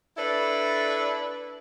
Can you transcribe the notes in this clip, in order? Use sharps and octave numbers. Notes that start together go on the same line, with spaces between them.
D4 E4 A4 B4 D5